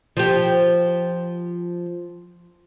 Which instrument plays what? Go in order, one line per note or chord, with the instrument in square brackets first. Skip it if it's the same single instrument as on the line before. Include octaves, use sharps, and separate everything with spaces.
[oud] F3 G4